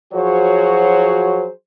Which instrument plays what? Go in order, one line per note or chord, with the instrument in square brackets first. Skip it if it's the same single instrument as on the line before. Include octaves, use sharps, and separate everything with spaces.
[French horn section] F3 F#3 F#4 G#4 C5 C#5